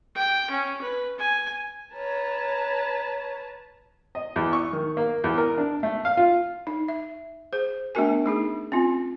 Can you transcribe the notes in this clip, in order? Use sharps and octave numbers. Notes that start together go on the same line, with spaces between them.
G5
C#4
B4
G#5
B4 C#5 A5 A#5
D#5
E2
C#6
D#3
A#3
E2
A#4
D4
A3
F5
F4
D#4
E5
G#4 C5
A3 B3 D4 F#4 A#4 G#5
A3 D#4 G#4
C4 C#4 F4